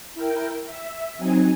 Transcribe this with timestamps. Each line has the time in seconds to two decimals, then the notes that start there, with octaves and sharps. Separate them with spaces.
0.14 E4 A#4 G5
0.66 E5
1.18 F#3 C4 D#4 G#5